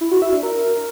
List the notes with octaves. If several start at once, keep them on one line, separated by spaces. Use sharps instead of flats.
E4
F#4
E5
D4
A#4